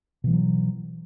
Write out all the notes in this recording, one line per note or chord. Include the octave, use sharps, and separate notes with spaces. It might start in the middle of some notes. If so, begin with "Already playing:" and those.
B2 E3 F#3 G3